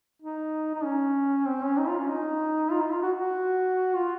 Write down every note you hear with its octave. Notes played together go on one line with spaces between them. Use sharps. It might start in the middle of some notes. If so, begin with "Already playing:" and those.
D#4
D#4
C#4
C4
C#4
D#4
F4
C#4
D#4
F4
D#4
F4
F#4
F#4
F4